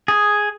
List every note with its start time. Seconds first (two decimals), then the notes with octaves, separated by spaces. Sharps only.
0.08 G#4